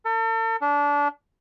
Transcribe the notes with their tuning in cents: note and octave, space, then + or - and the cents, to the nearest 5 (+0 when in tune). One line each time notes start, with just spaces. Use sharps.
A4 +40
D4 -25